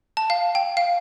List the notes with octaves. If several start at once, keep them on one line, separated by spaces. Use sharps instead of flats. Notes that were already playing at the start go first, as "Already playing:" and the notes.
A5
F5
G5
F5